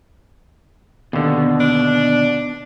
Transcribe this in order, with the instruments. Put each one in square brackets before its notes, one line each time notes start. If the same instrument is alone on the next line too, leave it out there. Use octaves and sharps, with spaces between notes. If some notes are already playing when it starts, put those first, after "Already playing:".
[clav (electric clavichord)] D#2 D3 [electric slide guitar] B2
[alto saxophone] D4